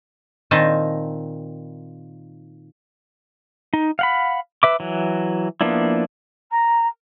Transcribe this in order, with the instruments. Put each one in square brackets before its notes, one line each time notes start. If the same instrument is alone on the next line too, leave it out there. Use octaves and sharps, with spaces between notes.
[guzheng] A#2 D#3 C4 D#5 A5
[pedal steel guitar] D#4
F5 F#5 B5
B4 E5 D6
E3 F#3
F3 A#3 B3 D4 E4
[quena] A#5